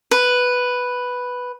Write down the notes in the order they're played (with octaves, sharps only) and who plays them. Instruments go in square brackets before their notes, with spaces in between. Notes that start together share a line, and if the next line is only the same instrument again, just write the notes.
[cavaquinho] B4